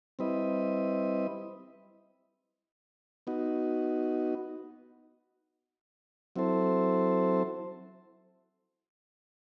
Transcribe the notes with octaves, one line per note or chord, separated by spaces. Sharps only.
G3 C4 E4 B4 D#5
B3 D#4 F#4
F#3 C4 E4 A4 C5